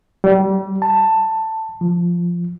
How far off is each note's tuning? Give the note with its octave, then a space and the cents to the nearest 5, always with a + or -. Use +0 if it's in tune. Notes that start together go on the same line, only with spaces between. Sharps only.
G3 -30
A5 +10
F3 -5